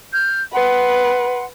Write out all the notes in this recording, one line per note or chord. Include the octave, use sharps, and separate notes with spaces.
F6 G6
B4 F#5 C6